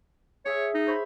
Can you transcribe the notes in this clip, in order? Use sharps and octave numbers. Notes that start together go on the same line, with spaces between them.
G#4 C#5 E5
D#4
C5 C#5 B5